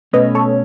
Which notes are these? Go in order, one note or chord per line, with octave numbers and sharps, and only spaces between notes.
B2 A3 C#4 B4 D#5
A4 C#5